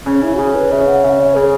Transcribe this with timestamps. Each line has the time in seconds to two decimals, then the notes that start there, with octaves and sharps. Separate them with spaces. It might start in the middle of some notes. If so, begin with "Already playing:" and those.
0.06 C#3 C#4
0.23 E4
0.35 F#4
0.39 C#3 G#4
0.55 B4
0.71 C#3 E5
0.88 F#5
1.04 C#3 E5
1.20 C#5
1.36 C#3 G#4